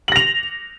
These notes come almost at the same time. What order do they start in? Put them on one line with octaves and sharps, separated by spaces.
F#7 A#6 F7